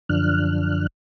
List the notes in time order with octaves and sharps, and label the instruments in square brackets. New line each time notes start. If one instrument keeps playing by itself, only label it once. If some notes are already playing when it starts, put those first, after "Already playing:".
[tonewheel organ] F#2 D3 F3 D4 F6 F#6